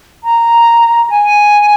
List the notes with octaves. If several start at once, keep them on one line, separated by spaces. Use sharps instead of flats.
A#5
G#5